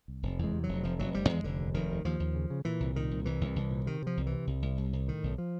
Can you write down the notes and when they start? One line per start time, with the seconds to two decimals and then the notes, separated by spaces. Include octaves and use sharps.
0.08 C2
0.23 F1
0.39 E2 G#3
0.54 C3
0.64 F1 F#3
0.84 F1 F3
0.99 F1 F#3
1.13 F1 G3
1.29 E2 G#3
1.44 F1 D3
1.60 D#2
1.74 F1 D#3
1.89 D#2
2.05 D#2 F3
2.20 D#2
2.35 C#3
2.50 C#3
2.65 A#2 E3
2.80 C2
2.96 A#2 D#3
3.11 C2
3.25 C2 E3
3.41 C2
3.56 C2
3.71 A#2
3.86 C3 D#3
4.02 C3 F3
4.17 C2
4.27 E3
4.32 C3
4.47 C2
4.62 C2
4.78 C2
4.93 C2
5.08 A2 D#3
5.23 B1
5.38 F3